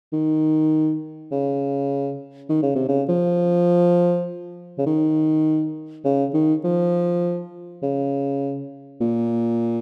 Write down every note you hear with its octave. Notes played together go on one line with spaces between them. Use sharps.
D#3
C#3
D#3
C#3
C3
C#3
F3
C#3
D#3
C#3
D#3
F3
C#3
A#2